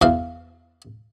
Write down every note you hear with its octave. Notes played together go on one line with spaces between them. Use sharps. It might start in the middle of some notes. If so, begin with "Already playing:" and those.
E2 E3 F5